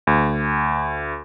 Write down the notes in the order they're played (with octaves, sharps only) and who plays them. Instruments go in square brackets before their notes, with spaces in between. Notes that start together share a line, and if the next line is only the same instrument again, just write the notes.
[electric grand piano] D2